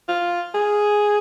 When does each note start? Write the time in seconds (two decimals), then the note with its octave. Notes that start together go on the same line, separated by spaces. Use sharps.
0.08 F4
0.54 G#4